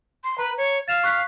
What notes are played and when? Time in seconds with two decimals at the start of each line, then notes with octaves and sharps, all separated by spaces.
0.24 C6
0.38 B4 A#5
0.58 C#5
0.88 F5 A6 E7 F7
1.03 C#6 F#6 B6